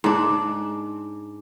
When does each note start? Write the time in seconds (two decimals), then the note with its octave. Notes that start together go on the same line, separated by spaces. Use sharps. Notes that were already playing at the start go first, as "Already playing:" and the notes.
0.04 G#2 D4